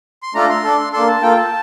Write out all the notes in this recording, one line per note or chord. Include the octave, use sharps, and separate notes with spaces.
C6
A3 D4 F4 A4 A#5
C6
D4 A4
A#3 D4 A4 C6
A5
A#3 F4 A4 G5
G5
A5